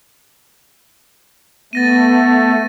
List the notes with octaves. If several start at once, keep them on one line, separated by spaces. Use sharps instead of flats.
A3 B3 A6 A#6 D#7